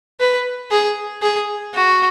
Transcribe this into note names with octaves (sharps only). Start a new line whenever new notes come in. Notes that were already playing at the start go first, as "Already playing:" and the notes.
B4
G#4
G#4
F#4